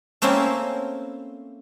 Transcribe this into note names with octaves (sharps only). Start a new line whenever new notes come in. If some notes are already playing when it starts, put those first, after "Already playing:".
A3 A#3 C4 C#4 E4 C5